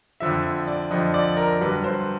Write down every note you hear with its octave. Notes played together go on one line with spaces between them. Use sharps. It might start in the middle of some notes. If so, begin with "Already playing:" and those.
F2 D3 F3 E5
D5
F2 D3 F3 D#5
D5
A#4
G2 D3 F#3 B4
C5